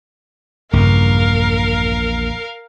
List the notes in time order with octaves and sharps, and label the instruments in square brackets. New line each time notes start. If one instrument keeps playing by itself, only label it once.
[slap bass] A#1 E2 [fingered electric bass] G2 C#3 [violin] A#4 F5